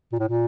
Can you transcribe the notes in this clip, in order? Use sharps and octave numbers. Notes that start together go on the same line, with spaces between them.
A#2
A2
A#2